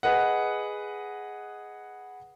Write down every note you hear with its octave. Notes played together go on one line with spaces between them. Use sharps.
G#4 B4 D#5 F#5